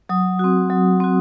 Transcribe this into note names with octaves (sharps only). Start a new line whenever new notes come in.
F#3 D#6
C4 F#4
F#3
C4 F#4